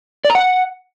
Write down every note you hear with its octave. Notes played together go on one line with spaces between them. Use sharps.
D5
A#5
F#5